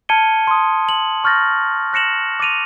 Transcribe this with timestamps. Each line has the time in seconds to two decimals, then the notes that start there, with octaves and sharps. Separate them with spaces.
0.09 A5 F6 G#6 C#7 D#7 G7
0.47 C6 D#6
0.89 F#7
1.24 C#6 F6 G6 A6 A#6
1.93 F#6 A#6 C#7 E7 F#7
2.40 D6 A6 D#7 F7